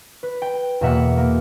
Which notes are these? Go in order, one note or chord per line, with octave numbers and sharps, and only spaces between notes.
B4
G5
E2 B2 A#3 E5 F#5
A#3